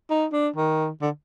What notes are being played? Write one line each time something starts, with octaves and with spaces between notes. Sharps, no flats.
D#4
D4
D#3
D3